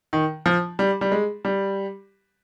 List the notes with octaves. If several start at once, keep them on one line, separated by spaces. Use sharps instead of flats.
D#3
F3
G3
G3
G#3
G3